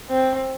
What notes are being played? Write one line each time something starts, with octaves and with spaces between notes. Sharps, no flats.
C4